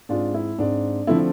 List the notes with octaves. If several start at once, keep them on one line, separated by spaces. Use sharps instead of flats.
G#2 G#3 C4 D4 F4
E4
G#2 G#3 C4 D4
D3 F3 A3 C4 E4